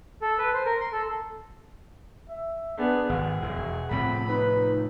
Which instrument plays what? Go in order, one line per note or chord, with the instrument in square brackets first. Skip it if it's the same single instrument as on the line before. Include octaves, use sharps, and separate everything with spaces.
[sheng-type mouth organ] A4
B4
C5
A#4
C6
A4
[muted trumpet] E5
[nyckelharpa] B3 G#4 [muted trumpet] D4
[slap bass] G#1 [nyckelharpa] G#4 [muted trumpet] F#5
[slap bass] E1
[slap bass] A2 C3 F3 [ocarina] C4 [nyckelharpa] B5
[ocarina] D#4 [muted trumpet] B4